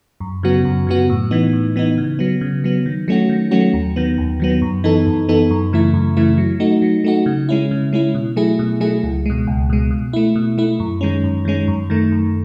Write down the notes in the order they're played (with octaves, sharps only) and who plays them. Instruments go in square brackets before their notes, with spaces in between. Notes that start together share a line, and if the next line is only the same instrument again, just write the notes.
[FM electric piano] F#2
C#3 F#3 B3 F#4
F#2
C#3 F#3 B3 F#4
A2
E3 B3 D#4
A2
E3 B3 D#4
C#3
F#3 B3
C#3
F#3 B3
D#3
F#3 A3 C#4 F#4
D#3
F#3 A3 C#4 F#4
D#2
D#3 F#3 B3
D#2
D#3 F#3 B3
F#2
E3 B3 D#4 A4
F#2
E3 B3 D#4 A4
F#2
C#3 E3 A3 E4
F#2
C#3 E3 A3 E4
F#3
A3 D#4 F#4
F#3
A3 D#4 F#4
C#3
G#3 C#4 E4
C#3
G#3 C#4 E4
B2
F#3 A3 E4 G#4
B2
F#3 A3 E4 G#4
C#2
B2 G#3
C#2
B2 G#3
B2
A3 E4
B2
A3 E4
F#2
D#3 G#3 C#4
F#2
D#3 G#3 C#4
F#2
D#3 A3
F#2